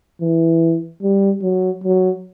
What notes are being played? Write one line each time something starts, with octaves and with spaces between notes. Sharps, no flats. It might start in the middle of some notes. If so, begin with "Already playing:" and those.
E3
G3
F#3
F#3